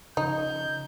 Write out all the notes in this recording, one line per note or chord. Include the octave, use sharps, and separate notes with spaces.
C#3 F3 D#4 G6